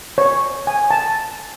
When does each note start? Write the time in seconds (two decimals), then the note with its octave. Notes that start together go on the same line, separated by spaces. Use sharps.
0.18 C#5
0.67 G#5
0.91 A5